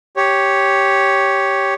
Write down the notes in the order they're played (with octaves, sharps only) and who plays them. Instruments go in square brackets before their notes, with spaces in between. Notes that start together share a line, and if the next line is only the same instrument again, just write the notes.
[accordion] G4 C#5